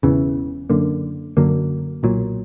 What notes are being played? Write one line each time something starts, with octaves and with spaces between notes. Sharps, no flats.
E1 E2 C#3 E3
F#2 D3 A#3
F#2 D3 F#3 A#3
B1 A#2 F#3